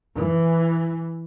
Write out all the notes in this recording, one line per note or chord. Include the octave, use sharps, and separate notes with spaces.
E3